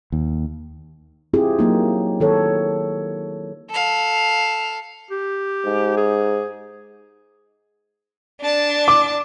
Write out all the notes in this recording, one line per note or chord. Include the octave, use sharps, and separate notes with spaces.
D#2
C4 E4 F4 G4 G#4
F#3 A#3 D#4
D#3 A4 C#5
A4 F5
G4
G#2
G#4
D4 A5
D6